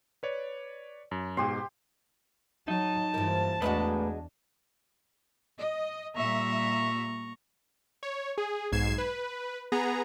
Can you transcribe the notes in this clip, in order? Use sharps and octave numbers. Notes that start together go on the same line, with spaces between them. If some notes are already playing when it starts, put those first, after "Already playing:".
B4 C#5 D5
F#2
G#2 B2 G4 C6
F#3 D#4 A5
G2 E3 F3 A#3
E2 G#3 A3 D4 D#4 F#4 B4
D#5
A#2 G3 E5 A#5 C#6
C#5
G#4
B1 G#2 G#6 C7 E7
B4
B3 G#4 A#5